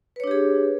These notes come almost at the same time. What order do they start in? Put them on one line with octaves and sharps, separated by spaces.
B4 C#5 D4 G4 G#4